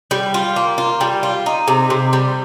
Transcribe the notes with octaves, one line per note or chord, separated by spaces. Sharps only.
G3
F4
A#3
F4
G3
F4
D#4
C3
C3
G3